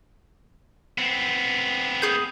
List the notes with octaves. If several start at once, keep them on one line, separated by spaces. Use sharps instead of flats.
B3 C4
G#4 G6